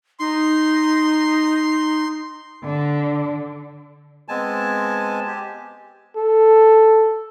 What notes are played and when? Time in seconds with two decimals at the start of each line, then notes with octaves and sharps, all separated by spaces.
0.20 D#4 C6
2.63 D3
4.28 G#3 B3 C4 G#5 A5
5.27 G4
6.16 A4